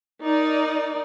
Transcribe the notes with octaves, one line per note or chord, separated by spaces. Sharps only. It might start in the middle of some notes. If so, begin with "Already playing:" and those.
D#4 A#4 D5